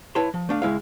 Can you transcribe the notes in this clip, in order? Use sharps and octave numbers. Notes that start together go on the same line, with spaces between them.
E4 B4 C#5 A5 C6
F3
A3 D4 F5
C#2 G#3 E4 F5